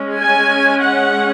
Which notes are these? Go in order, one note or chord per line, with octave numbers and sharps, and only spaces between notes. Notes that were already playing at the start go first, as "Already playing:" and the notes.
Already playing: G#3 C#4
G#5
F#5